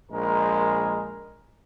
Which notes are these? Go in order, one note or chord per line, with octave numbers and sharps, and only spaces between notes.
A#1 G#3 A#4